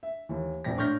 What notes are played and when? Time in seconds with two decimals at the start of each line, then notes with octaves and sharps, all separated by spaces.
0.03 E5
0.29 D#2 E3
0.64 E1 A#1 F2 D5 G5 A#6
0.77 A2 D4 C#6 F6 G6 A#6